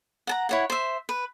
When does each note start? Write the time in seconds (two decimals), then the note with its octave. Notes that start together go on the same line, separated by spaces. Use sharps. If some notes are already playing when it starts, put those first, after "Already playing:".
0.27 F#5 A5 A#5
0.49 E4 C#5 F#5
0.70 C5 E5
1.09 B4